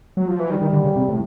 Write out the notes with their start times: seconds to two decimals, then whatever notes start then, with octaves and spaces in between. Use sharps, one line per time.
0.17 F#3
0.28 F3
0.39 E3
0.50 D#3 G3
0.62 D#3
0.73 D3
0.84 C#3
0.96 C3
1.08 A2